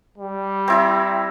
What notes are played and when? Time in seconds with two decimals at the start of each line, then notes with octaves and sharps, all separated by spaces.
0.18 G3
0.68 C4 E4 A#5